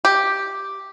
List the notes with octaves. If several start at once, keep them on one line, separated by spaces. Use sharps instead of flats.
G4